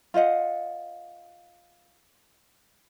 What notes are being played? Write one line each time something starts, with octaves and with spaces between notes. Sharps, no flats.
F4 C5 D#5 F#5